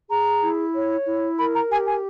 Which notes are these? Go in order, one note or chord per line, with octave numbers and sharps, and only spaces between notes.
G#4 A#5
E4
C#5
E4
A#4 B5
A#5
G4 G#5
G#5